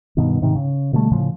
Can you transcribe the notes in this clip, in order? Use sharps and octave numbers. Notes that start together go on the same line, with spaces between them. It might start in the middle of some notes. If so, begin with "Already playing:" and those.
G2 B2 D#3
G#2 C3 D#3
C#3
B2 D3 G3 A3
A2 C#3 F3